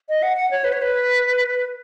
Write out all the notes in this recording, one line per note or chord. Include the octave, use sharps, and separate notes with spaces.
D#5
F#5
F#5
C#5
B4
C#5
B4